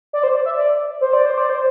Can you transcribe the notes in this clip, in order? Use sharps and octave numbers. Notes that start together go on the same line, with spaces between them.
D5
C5
D5
E5
D5
C5
D5
C5
D5
C5